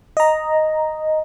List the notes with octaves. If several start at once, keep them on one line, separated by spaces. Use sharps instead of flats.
D#5 A#5